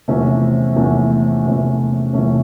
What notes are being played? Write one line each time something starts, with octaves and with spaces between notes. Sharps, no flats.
E2 C3 F3 A3 C#4
E2 C3 F3 A3 C#4
E2 C3 F3 A3 C#4
E2 C3 F3 A3 C#4